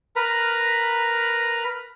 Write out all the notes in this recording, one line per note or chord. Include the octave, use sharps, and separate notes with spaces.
A#4 B4 A#5 B5